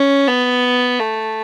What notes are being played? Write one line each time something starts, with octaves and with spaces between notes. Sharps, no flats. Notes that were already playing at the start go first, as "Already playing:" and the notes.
Already playing: C#4
B3
A3